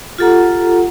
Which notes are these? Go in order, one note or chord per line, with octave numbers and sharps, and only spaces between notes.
F4 G4 A4 F#5 A#5